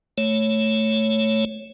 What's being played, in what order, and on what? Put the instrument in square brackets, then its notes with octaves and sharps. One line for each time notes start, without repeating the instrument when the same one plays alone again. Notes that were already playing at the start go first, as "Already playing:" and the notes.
[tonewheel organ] A3 C#5